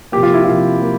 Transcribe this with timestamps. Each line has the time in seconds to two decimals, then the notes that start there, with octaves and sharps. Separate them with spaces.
0.12 C3 F3 A#3 G4
0.23 F4
0.33 E4
0.44 C3 F3 A#3 F4
0.82 F3 A#3